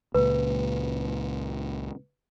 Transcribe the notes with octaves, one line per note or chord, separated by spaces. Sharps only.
C#2 A#2 B4